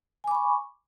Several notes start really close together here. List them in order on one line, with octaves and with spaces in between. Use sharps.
G#5 D6 B5 C#6